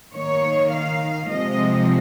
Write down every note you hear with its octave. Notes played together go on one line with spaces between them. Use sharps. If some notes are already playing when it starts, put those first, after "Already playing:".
D#3 A#3 C#5
F5
C3 F3 G#3 C4 D#5